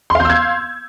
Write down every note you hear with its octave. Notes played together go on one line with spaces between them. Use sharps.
F5 C6 E6 G6 G#6